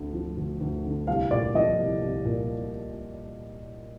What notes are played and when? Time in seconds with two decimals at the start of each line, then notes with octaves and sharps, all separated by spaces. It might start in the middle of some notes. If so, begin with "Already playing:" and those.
Already playing: D2 D3
0.14 F3
0.37 D2
0.61 D2
0.84 D3
1.07 C2 F5
1.31 A#2 D5
1.55 F3 D#5
1.78 C2
2.02 C2
2.25 A#2